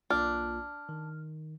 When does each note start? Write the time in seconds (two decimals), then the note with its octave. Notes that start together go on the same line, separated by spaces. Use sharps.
0.10 B1 A#3 D4 F4 F6
0.89 D#3